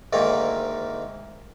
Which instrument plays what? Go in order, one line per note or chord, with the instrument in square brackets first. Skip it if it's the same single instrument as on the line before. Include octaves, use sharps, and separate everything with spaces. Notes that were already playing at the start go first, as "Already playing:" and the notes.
[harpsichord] D2 G#2 D#3 A#3